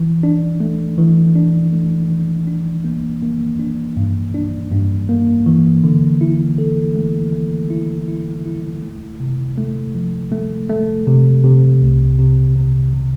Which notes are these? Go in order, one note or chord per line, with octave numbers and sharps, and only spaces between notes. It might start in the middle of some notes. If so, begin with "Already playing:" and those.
Already playing: E3
D4
A3
E3
D4
A3
E3
D4
A#3
A#3
D4
G2
D4
G2
A#3
E3
D3
E4
A4
A3
A3
E4
E4
E4
A3
C3
A3
F3
A3
A3
C3
C3
C2
C3
C3
C3